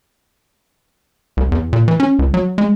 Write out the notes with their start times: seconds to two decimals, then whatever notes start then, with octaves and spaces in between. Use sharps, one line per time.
1.37 C2
1.52 E2
1.73 A#2
1.88 E3
2.00 C#4
2.19 C#2
2.34 F#3
2.58 G#3